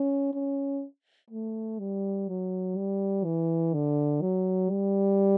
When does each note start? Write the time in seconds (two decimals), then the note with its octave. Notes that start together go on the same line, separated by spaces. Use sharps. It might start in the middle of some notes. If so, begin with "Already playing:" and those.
Already playing: C#4
0.34 C#4
1.30 A3
1.79 G3
2.28 F#3
2.77 G3
3.25 E3
3.74 D3
4.21 F#3
4.70 G3